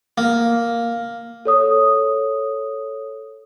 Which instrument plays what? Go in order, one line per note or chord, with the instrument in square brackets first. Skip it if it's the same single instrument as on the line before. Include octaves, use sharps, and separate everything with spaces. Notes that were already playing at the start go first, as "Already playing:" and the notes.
[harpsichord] A#3
[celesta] A4 C#5 D#6